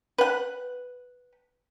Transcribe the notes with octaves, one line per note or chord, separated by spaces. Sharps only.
B4 F#5